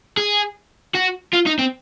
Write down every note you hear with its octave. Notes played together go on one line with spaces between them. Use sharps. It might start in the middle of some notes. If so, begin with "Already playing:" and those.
G#4
F#4
F4
D#4
C4